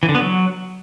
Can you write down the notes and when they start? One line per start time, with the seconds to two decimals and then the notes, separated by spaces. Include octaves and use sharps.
0.03 E3
0.09 D3
0.15 B3
0.21 F#3